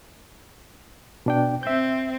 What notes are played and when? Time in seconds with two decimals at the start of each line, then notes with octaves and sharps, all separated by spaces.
1.26 B2 D4 G5
1.63 C4 E5 G6